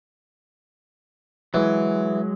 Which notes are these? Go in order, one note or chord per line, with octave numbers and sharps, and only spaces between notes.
E3 F#3 G#3